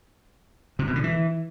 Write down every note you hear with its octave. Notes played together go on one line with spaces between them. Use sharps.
C3
B2
D3
E3